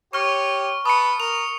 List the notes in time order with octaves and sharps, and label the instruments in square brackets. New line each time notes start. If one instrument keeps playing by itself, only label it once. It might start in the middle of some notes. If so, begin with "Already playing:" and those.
[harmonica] G4 C#5 [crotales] C#6 F6
[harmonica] B4 A5 [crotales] D#6 C#7
[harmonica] A#4 [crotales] F7